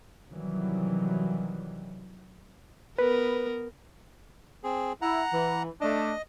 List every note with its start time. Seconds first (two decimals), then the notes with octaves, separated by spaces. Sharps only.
0.30 C3 D#3 E3 F#3 G3
2.98 B3 A#4 B4
4.64 C4 G#4
5.02 E4 F#5 A#5
5.32 E3
5.81 A3 D4 D#5